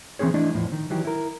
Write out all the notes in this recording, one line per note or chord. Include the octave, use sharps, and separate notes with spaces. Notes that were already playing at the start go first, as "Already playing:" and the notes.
E3 C4 C#4 G#4 C#5
E3 A3 D4 E4 D5 D#5
E2 A2 F3
D#3
D#3 E3 F#3 G4
E4 A#4